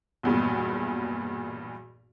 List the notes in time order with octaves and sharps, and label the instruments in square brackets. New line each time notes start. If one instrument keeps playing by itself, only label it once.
[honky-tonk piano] B1 E2 G2 A#2